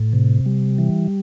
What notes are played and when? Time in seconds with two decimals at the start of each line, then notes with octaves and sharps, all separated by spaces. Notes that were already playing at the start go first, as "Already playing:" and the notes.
Already playing: A2
0.13 C3
0.46 G3
0.78 E3